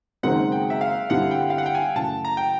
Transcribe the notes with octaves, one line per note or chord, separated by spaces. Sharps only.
F#1 F#2 D#3 G#3 C4 F#5
G5
E5
F5
G2 D3 G3 C4 E4 F#5
G5
F5
F#5
G5
G#5
F#2 C#3 E3 A3 A5
A#5
G5